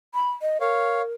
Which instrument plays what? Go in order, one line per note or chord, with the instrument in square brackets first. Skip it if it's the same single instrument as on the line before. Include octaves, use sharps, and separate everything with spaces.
[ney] B5
D#5
[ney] A#4 [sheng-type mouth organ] C#5 F5